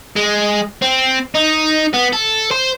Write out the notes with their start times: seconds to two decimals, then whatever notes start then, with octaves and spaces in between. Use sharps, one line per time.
0.16 G#3
0.82 C4
1.35 D#4
1.94 B3
2.13 A4
2.51 C5